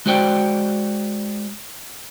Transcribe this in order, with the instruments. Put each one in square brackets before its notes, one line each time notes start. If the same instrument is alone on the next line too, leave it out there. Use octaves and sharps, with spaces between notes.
[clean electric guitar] G#3 F#4 C5 D5 G5